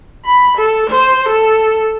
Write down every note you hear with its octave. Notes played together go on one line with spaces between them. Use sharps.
B5
A4
C5
A4